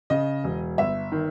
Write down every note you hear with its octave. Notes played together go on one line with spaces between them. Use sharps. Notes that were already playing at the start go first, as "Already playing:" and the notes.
C#3 D#5
E1
G1 E5
D#3